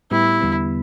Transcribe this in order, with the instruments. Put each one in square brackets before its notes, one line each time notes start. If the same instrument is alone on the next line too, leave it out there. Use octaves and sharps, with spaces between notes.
[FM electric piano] A2 G3 B3 G4 [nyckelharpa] E4
[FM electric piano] E2 D3 G3 B3